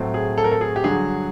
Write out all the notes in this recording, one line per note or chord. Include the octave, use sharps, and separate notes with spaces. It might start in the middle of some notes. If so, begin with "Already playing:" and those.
Already playing: A2 F#3 A3 C4
G#4
A4
A#4
A4
G#4
G4
G2 D3 F#3 G#4